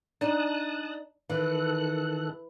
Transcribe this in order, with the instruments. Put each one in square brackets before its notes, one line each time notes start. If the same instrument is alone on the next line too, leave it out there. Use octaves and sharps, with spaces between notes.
[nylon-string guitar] D4 D#4 [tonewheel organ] A5 D#6 F#6
[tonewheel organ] D#3 A4 F#6 [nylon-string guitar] E3